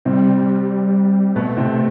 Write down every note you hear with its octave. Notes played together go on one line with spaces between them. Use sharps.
C3 G3 C4
B2 A3 B3
C3 C4